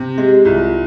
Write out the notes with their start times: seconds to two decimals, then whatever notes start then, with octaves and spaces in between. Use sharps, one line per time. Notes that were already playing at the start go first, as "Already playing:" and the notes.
Already playing: C3
0.18 G#3 G4
0.45 C2 F4